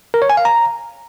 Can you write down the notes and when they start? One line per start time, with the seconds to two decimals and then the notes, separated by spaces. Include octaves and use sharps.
0.14 A#4
0.22 C#5
0.30 G#5
0.37 F5
0.45 A#5